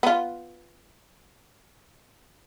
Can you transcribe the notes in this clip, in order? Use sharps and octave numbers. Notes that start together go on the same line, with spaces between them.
B3 F4